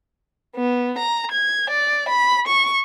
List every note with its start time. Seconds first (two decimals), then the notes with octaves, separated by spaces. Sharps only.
0.56 B3
0.98 A#5
1.32 G#6
1.70 D5
2.09 B5
2.47 C#6